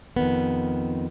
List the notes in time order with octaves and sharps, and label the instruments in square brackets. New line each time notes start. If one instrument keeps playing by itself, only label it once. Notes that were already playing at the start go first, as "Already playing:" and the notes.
[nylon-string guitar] F2 D#3 B3